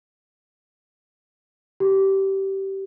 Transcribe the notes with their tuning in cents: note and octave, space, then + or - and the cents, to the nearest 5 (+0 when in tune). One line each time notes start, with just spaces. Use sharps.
G4 -20